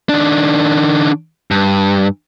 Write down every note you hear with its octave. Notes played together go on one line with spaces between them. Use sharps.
D#3 D4
G2